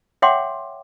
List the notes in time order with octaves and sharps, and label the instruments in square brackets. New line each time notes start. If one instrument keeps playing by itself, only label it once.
[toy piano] C#5 E5 F#5 G5 C6 D6